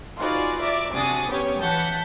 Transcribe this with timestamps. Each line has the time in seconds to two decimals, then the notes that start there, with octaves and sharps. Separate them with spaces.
0.17 D#4 F4 F#4 G#4 B4 D5
0.61 D5 E5 A#5 D6
0.93 C3 D4 F#4 G#4 D#6 A6
1.29 B3 C#4 G4 B4 C#5
1.60 E3 F#5 A5 G6 B6